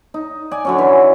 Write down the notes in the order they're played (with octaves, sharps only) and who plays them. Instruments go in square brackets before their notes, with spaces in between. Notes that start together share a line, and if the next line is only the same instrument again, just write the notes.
[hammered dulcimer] D#4
D5 G#5
D3 F#3 C#4
E3